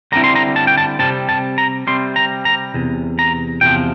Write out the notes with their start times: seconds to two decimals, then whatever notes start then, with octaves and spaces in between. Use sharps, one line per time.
0.12 D3 G3 C4 E4 A#5
0.24 C6
0.36 A#5
0.56 A5
0.67 G5
0.78 A5
0.99 C3 G3 C4 A5
1.29 A5
1.58 A#5
1.87 C3 G3 C4 C6
2.16 A#5
2.45 A#5
2.74 E2 C3
3.19 A#5
3.61 E2 C3 F3 G5